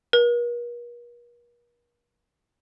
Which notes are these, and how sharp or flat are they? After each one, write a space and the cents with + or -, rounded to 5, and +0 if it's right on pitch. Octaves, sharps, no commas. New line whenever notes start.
A#4 +45